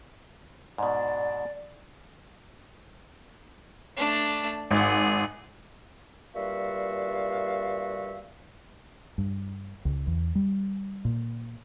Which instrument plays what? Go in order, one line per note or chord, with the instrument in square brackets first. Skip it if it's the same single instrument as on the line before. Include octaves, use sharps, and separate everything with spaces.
[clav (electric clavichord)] G#2 B2 [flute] D5
[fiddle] A3 D4
[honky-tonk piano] G#1 [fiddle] G#4 F#5
[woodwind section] G2 A#2 G3 F#4 E5 F5
[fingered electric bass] G2
C#2
E2
G3
A#2